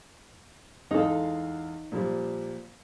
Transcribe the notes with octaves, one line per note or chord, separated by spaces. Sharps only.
E2 G#3 D#4 A4 F5
A#2 F3 G3